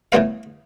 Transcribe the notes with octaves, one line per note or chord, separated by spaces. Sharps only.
A2 E3 G3 B3 F5